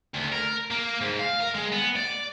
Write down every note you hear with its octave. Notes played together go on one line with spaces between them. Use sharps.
D2
A#4
A#3
G#2
F5
A#4
G#3
B3
D5